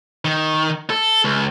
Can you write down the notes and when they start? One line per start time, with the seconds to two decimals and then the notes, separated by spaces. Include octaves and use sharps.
0.25 D#3
0.90 A4
1.24 C#2